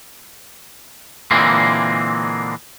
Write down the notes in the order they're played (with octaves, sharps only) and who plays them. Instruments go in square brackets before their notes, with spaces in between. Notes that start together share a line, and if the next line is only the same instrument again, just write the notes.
[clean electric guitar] A#2 D3 E3 G#3 A#3 C4